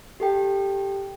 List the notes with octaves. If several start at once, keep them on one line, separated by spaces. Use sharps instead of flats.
G4 A4 G5